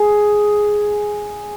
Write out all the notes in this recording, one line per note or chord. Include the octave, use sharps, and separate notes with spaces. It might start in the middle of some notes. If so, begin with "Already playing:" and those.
Already playing: G#4